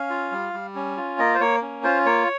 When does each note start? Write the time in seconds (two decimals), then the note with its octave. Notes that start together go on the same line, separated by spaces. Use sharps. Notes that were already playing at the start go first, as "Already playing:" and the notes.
Already playing: C#4 F5
0.10 F4
0.32 G3
0.53 G3
0.75 C#4
0.97 F4
1.19 A#3 D#5
1.35 C5
1.40 A#3 C#5
1.62 C#4
1.84 F4 C5
2.06 A#3 C#5